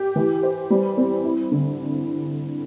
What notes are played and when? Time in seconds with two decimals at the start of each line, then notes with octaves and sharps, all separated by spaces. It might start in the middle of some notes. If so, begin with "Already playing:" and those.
Already playing: G4
0.16 E3
0.43 C5
0.70 G3
0.97 C4
1.24 E4
1.52 D3